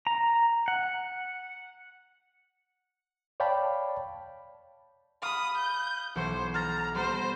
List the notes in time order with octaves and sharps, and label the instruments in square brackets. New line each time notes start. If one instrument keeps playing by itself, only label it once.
[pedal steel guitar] A#5
F#5
[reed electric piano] C#5 D5 F5 G5 A5 B5
[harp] F5 B5 [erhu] D#6
[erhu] G6
[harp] B1 E3 C#5 [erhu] C5
[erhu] A#5 [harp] F6 G6 A6
[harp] G3 B3 A#6 [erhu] C5